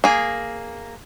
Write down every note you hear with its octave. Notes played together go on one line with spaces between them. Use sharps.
A#3 G#4